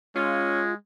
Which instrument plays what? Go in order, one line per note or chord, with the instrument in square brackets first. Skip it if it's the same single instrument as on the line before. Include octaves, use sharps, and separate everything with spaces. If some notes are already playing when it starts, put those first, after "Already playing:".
[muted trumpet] G#3 [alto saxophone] C#4 [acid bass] F4